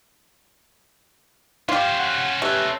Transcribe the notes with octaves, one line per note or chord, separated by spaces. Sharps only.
C#4 F4 G4 C5
F#5
A3 G4 B4